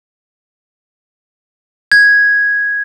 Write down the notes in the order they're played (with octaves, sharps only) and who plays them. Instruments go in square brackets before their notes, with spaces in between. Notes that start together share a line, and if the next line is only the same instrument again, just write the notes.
[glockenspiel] G#6